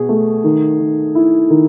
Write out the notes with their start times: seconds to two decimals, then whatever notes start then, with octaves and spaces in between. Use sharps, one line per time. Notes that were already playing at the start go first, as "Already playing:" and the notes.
Already playing: B2 G#4
0.09 A3
0.44 D#3
0.80 D#3
1.15 E4
1.50 D#3